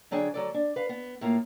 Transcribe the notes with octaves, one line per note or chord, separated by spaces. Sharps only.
D3 F#3 D4 G#4 G5
D2 F#3 A4 D5
D4
B4 F5
B3
A2 A#3 F4